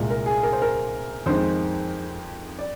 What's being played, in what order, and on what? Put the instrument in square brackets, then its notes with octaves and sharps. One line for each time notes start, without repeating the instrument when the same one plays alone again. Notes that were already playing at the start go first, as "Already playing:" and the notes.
Already playing: [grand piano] C2 A#2 G#3
A#4
G#4
A#4
C5
A#4
F2 D#3 G#3 C5
D5